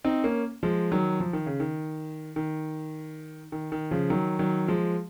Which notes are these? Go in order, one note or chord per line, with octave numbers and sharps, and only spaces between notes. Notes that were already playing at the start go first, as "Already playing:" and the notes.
C4 D#4
A#3 C#4
F3 G#3
D#3 F#3
F3
D#3
C#3
D#3
D#3
D#3
D#3
C#3 F3
D#3 F#3
D#3 F#3
F3 G#3